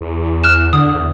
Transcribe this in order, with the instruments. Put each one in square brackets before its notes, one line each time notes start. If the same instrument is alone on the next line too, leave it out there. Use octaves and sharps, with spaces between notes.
[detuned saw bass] E2
[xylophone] F6 F#6 E7
[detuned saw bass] D3 [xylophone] D#6
[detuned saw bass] E2